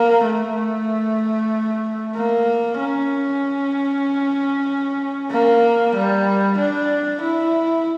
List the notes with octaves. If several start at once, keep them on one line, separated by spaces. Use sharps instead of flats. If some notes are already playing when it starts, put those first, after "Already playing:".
Already playing: A#3
A3
A#3
C#4
A#3
G3
D4
E4